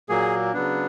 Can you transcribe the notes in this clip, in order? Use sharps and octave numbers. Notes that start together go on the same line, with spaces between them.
A#2 F#3 A#3 G#4
C#3 F#3 B3 D4